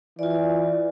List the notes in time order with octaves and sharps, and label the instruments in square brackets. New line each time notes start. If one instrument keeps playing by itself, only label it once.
[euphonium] E3 [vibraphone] F4 D5